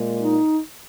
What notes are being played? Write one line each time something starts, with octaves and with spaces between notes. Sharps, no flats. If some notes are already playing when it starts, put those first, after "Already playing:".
Already playing: A#2 G#3
D#4